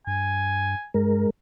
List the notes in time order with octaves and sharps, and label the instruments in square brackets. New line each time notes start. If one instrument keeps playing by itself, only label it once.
[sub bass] G2 [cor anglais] G#5
[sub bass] G2 [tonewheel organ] G#3 A#4